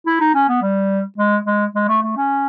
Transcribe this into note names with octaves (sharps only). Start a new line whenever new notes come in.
E4
D#4
C#4
B3
G3
G#3
G#3
G#3
A3
A3
C#4